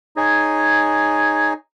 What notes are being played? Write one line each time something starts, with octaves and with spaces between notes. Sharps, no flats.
D#4 G#4 C#5 G#5